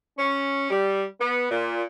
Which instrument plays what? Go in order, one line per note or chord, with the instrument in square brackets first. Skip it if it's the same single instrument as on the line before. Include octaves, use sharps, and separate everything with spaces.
[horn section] C#4
G3
B3
A#2